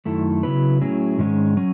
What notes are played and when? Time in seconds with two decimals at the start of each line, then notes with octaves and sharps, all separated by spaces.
0.05 F#2 D#3 A3 E4 A4
0.43 C#3 F#3 B3 E4 B4
0.81 A2 F#3 C#4 E4 G#4
1.19 G#2 D#3 G#3 C#4
1.57 F#3 C#4